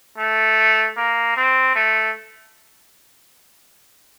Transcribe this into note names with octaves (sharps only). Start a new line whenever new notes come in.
A3
A#3
C4
A3